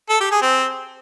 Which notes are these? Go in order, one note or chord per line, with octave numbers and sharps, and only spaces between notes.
A4
G4
G#4
C4